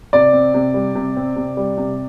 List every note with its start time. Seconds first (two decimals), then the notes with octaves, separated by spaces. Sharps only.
0.13 C3 D5
0.33 C4
0.54 C3
0.74 G3
0.95 C3
1.17 C4
1.36 C3
1.57 G3
1.78 C3